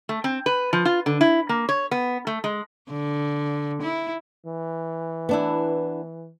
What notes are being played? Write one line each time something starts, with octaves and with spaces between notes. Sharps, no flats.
A3
C4
B4
F3
F4
D3
E4
A#3
C#5
B3
A3
G#3
D3
E4
E3
B3 D4 E4